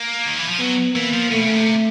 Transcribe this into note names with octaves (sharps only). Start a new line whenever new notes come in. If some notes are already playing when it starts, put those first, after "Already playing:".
Already playing: A#3
D#3
E3
F3
F#3 B3
E3 A#3
F3
B2 A3
C#3
C3